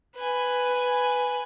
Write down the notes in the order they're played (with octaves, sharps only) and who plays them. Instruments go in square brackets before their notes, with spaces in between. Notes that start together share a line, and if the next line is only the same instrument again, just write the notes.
[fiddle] B4 G#5